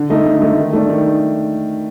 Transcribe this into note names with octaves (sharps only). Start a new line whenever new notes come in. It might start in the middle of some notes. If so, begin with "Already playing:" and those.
Already playing: D3
A3 D#4
D3
A3 D#4
D#3
A3 D4
D#3